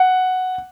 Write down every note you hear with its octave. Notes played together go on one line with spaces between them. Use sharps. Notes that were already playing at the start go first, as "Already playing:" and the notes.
Already playing: F#5